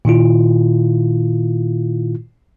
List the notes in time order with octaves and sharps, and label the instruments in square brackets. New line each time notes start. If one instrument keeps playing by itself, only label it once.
[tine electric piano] A#2 D#3 E4 F4